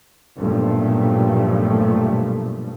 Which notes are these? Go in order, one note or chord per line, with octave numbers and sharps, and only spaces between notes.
B1 G2 A#2 F3 A3